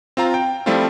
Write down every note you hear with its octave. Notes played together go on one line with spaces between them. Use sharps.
C4 F4 A#5
G5
F3 G3 A3 C4 E4 F4